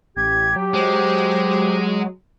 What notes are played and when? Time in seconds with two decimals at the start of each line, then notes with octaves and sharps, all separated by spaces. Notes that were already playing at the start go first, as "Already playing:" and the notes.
0.16 A1 G4 G#6
0.56 F#3
0.74 G#3 C5